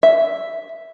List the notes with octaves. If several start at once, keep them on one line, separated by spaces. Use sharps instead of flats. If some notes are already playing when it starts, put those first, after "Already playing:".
E5